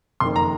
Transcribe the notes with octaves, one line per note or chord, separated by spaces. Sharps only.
F#1 F2 D#3 C6
A#5